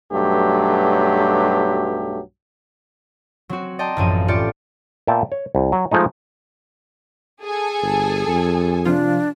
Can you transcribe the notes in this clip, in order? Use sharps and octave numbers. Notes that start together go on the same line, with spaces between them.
B1 G2 F#3 A3 G4
F#3 C4 F#4
D5 D#5 G5 A5 A#5 C6
A1 F#2 F3 D#7
A2 F4 G4 D5 C#7
A#2 B3 E5 G5 A5
C#5
C2
F#3
F3 G#3 A3 D#4
G#4 A4 G#5
G1
F2
C3 F3 D4 F4